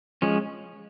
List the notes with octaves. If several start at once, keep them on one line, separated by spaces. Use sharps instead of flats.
F3 G#3 C#4